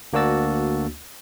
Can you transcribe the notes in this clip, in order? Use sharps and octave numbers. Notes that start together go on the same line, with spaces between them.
D2 A#3 D4 F#4 E6 A6